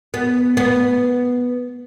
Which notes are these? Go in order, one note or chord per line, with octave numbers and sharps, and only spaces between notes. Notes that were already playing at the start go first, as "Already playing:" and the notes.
B3
B3